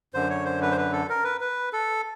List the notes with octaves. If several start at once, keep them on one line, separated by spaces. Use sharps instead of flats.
F#2 D3 C5
C#5
C5
B4
C5
B4
A4
A#4
B4
B4
A4